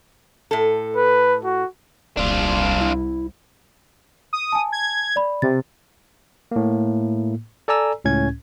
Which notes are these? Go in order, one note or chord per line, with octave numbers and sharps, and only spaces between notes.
A2 A4
B4
F#4
D#1 C2 D4 F4
E4
D#6
G#5 A5
G#6
D5 B5
C3 A6
A2 A#3
A4 D5 G#5 A#5 E6
C#2 A2 C#4 G#6